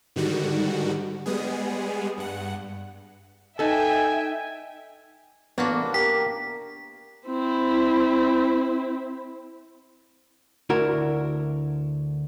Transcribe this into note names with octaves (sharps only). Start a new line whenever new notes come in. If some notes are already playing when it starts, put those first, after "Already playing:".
G#2 D3 D#3 G3 F#4
G3 G#3 B3 G#4
G2 F#5
D#4 A4 B4 E5 G5 G#5
A1 A#3 B3 D4 F#4
G4 A#4 B6
C4 E4
D2 D3 E4 F#4 A#4